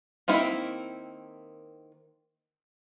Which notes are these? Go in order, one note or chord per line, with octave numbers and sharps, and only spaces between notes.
D#3 A#3 C4 E4